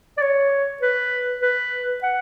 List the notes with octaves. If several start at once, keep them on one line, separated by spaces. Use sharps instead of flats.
D5
C#5
B4
B4
F#5